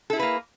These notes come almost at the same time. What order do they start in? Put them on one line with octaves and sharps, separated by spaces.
A4 E4 G#4 B4 A#3